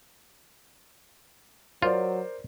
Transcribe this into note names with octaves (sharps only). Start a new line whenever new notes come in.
F#3 F4 A#4 C5 D5